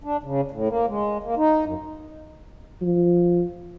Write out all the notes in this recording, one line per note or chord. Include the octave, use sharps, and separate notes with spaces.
D4
C#3
A2
A#3
G#3
A#3
D#4
F#2
F3